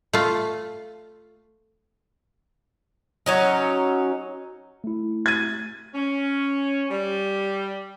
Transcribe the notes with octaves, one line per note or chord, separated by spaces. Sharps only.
A3 F4
F#3 C#4 D#4
A3 E4
G#6 A6 D#7
C#4
G3